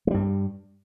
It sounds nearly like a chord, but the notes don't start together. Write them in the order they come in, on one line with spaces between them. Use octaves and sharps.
G#3 G3 G2